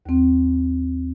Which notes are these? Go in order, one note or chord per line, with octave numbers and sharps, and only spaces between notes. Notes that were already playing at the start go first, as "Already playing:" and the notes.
D#2 C4